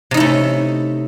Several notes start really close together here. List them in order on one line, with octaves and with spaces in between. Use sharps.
C3 D#4 E4 A3 C#4